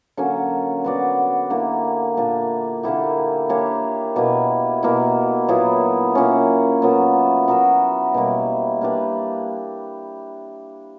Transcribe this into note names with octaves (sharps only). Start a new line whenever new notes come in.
D3 F#3 A#3 C#4
B3 F#4 B4 D5
D3 A#3 E4 G4
A#2 A#3 D4
D3 A#3 E4 G4
A#3 D4 G4 C#5
B2 A#3 E4
B2 A#3 E4
A#2 F#3 B3 E4
A#2 A#3 C#4
A#2 F#3 B3
B3 F#4 A#4 E5
B2 G3 A#3 E4
A#3 D4 G4 B4